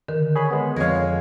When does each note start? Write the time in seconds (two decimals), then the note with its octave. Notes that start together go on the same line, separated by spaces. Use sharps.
0.08 D3 D#3 A#4
0.36 G#4 C#5 B5
0.51 G#3 B3
0.76 F2 G#3 C#5 F5 G#6